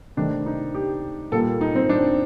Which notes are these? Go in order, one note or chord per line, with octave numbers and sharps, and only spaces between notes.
C3 D#3 A3 D4
D#4
G4
A#2 G3 A#3 A4
D#4
C4
D4